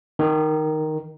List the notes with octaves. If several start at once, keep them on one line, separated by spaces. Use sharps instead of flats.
D#3